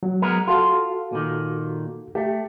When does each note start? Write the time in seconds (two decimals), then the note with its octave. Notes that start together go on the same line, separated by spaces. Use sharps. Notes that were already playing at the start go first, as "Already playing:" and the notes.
0.03 F#3
0.22 G#3 B3 A#4
0.48 F4 F#4 A4 F5
1.12 A#2 D#3
2.15 A3 G4